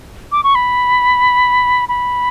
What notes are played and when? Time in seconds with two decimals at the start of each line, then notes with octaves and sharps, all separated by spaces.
0.32 D6
0.44 C#6
0.55 B5
1.89 B5